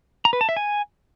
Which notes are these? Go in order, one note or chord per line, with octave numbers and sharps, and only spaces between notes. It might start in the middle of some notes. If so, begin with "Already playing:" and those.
A#5
B4
A5
E5
G#5